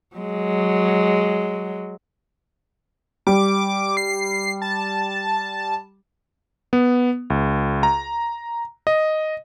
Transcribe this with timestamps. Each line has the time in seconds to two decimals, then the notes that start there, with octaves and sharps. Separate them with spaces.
0.16 F#3 G#3
3.27 G3 D6
3.97 C7
4.62 A5
6.73 B3
7.30 C#2
7.83 A#5
8.87 D#5